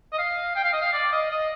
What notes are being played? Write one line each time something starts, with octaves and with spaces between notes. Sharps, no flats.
D#5
F5
G5
F5
D#5
F5
D5
D#5
D#5